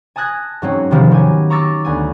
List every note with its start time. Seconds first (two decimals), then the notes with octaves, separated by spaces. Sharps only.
0.16 G#5 A5 D#6 F#6 G#6 A#6
0.62 G#2 F#3 C4 C#4
0.91 C3 D#3 F3 B3 C4
1.11 F#3 G4 G#5
1.50 A#5 C#6 D6 E6 A6 A#6
1.85 D2 B3 G#5